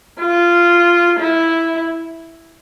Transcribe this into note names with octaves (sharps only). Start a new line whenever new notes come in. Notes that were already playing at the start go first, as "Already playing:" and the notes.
F4
E4